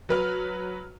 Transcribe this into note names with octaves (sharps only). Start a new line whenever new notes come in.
F#3 B4 F6